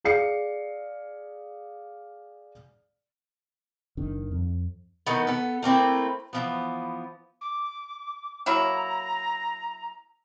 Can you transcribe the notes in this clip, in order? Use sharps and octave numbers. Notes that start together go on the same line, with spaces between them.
G#4 D5 F5 C7 C#7
F#1 D#3 D4
F2
D#3 E3 A3 B3
B3 A4
A3 A#3 C4 E4
E3 F3 B3
D6
F#3 A#3 E4 A#5